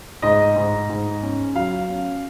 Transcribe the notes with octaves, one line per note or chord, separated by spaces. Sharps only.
G#2 D#5
G#2
G#2
C#4
F#3 F5
C#4